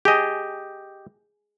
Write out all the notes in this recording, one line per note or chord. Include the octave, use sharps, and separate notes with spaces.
G4 G#4 D#5